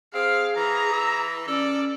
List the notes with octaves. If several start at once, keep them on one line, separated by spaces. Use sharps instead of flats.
C4 G#4 F5
E3 A#5
E6
C#4 A4 D5